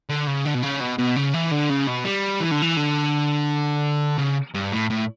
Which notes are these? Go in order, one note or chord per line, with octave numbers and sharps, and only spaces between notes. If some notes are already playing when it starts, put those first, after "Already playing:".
D3
C#3
D3
B2
C#3
B2
B2
C#3
E3
D3
C#3
B2
G3
E3
D3
E3
D3
C#3
G2
A2
A2